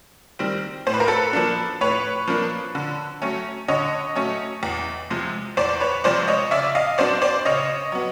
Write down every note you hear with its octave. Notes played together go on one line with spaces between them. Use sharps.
D#3 G3 C4
A2 C5
B4
A#4
A4 B4
F3 A#3 D4
A2 B4 C#5
F3 A#3 D4
D3
F#3 A3 C#4
D3 C#5 D#5
F#3 A3 C#4
E2
C3 F3 G#3
E2 C5 D5
B4 C#5
C3 F3 G#3 C5 D5
C#5 D#5
C#3 D5 E5
D#5 F5
F#3 B3 D4 C5 D5
C5 D5
C#3 C#5 D#5
F#3 B3